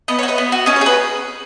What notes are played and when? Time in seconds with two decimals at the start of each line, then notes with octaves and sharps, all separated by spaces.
0.08 B3 D#5
0.19 F#4 C#5
0.28 B4 D#5
0.38 B3
0.52 F#4
0.66 C#4 D#5
0.76 C#5
0.81 G#4 B4